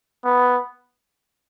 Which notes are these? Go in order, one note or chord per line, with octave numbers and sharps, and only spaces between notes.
B3